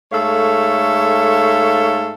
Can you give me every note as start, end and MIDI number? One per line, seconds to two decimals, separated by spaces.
0.12 2.14 44
0.12 2.14 57
0.12 2.14 69
0.12 2.14 73
0.12 2.14 77